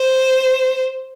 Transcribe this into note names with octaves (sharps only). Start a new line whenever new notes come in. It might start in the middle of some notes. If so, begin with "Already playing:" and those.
Already playing: C5